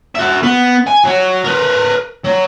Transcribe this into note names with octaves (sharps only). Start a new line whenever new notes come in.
F#4 E5
B3
G#5
F#3 C#5
A#4 B4
F#3